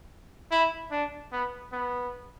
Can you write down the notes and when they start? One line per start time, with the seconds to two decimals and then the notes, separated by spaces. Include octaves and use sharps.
0.51 E4
0.91 D4
1.32 B3
1.72 B3